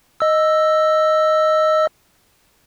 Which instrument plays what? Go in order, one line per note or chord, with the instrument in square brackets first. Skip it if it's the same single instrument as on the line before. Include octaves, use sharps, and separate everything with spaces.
[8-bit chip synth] D#5 E6